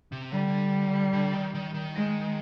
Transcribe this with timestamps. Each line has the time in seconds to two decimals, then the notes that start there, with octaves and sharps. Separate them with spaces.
0.12 C3
0.32 D3 G3
1.13 D3
1.33 D#3
1.54 D#3
1.74 D#3
1.95 G#3